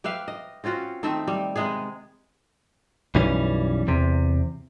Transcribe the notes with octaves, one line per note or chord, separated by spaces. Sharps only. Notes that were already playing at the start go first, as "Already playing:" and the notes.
G4 B4 E5 F5
D#5
C4 C#4 F4 F#4
D#3 A3 C4 E5
G3
C3 G#3 B3 G#4
B1 F#2 E3 G3 C#4
E2 C3